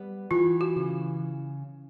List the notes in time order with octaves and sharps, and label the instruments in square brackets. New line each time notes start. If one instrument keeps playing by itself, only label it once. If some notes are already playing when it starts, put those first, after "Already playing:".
Already playing: [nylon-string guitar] G3 B3
[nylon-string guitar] E3 [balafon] F4
[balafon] F#4
[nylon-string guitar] C#3